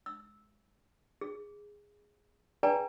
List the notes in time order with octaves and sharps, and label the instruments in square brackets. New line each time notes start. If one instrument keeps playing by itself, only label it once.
[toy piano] E6
G#4
G#4 B4 D5 G5 G#5 A#5